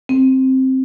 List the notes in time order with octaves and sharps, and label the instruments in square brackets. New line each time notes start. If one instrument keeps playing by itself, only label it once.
[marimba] C4